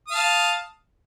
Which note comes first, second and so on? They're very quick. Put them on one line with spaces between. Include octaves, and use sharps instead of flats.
D#6 F5 A5